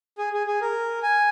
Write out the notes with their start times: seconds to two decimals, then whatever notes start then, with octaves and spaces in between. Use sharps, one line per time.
0.18 G#4
0.33 G#4
0.47 G#4
0.61 A#4
1.02 G#5